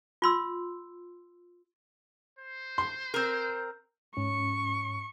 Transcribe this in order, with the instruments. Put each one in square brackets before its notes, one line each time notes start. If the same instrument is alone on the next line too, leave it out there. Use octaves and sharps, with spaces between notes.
[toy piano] F4 C6 E6
[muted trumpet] C5
[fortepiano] C6
[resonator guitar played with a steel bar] C4 A#4
[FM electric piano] G#2 C#4 [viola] C#6